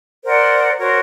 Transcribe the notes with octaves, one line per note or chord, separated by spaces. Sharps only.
A#4 C5 D5 F#5
F#4 A#4 C5 C#5